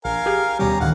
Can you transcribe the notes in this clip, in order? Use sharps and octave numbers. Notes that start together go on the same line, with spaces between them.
A#1 A#4 F5 G#5
G4 G#4
D#2 B2 G3 C#4 G4 A#5
D2 A2 D#3 F5 F#5